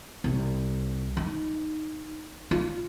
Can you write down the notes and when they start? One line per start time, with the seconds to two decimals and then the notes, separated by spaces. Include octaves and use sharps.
0.24 C2
1.17 D#4
2.51 F4